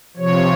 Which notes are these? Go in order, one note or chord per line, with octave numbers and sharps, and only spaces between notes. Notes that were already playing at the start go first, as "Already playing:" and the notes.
C3 F3 C#5